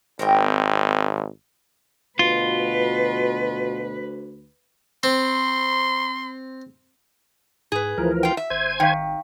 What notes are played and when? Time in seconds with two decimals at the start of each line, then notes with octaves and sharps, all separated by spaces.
0.19 G#1 C4 A#4 G5
2.19 D2 B2 F4 B4
5.03 C4 C6
7.72 G#2 G#4 B4
7.98 D2 E3 F3 A#4
8.23 F4 G5
8.37 E5
8.50 G#1 C5 G#5 G#6
8.80 D#3 F5 G5